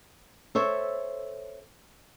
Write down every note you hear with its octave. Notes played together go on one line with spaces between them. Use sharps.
A4 C5 C#5 E5